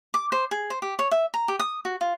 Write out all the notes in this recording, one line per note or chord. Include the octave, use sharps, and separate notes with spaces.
D6
C5
G#4
C5
G4
C#5
E5
A#5
G4
D#6
F#4
F4